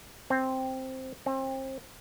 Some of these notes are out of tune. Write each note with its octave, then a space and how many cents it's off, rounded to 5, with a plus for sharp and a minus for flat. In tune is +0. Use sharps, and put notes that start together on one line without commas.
C4 +0
C4 +30